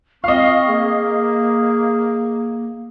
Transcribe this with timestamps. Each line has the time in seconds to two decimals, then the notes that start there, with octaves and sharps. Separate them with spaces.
0.24 C4 D#5 F5 C#6
0.68 A#3 G#4